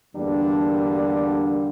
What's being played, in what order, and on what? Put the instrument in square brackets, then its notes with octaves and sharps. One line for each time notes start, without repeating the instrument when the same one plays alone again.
[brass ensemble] E2 D3 G3 A#3 D4